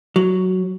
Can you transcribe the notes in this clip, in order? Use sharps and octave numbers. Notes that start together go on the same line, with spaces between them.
F#3